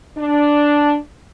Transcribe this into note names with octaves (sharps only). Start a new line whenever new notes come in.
D4